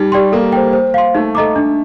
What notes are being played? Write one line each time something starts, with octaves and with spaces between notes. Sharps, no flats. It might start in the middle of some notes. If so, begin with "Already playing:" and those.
Already playing: G3 D#4
G4 D5 G5 C6
A#3 A4
C5 G5
C5
F5 C6
A3 D#4
A4 D#5 A#5 D6
D4